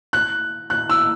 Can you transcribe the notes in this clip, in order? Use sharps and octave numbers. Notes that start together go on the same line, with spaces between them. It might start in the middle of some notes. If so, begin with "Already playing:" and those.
F#6
F#6
E6